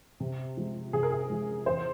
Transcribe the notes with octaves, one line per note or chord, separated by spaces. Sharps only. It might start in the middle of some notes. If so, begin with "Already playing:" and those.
C3
F3 G#3
C3 G#4
A#4
G#4
F3 G#3
E2 C5